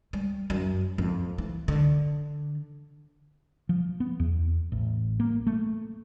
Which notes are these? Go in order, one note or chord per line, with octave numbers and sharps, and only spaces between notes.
G3
F#2
F2
E3
D3
F3
B3
E2
A1
A#3
A3